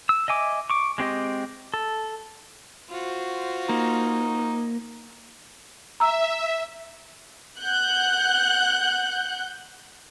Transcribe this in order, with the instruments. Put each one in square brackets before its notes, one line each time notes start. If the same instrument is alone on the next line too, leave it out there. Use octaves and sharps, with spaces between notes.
[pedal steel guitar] E6
D#5 E5 G#5 D6
C#6 D6
G#3 C4 G4 D#5
A4
[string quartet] F4 F#4 C5
[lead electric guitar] A#3 [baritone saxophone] D#4
[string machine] E5 [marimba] A#5 E6
[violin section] F#5 F#6 G6